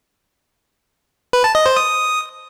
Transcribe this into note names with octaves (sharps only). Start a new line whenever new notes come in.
B4
A5
D#5
C5
D#6